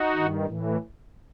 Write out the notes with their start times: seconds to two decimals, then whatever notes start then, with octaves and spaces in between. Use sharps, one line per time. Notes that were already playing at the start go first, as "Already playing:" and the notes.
Already playing: D#4 F#4
0.14 G2 D#3
0.45 A2 E3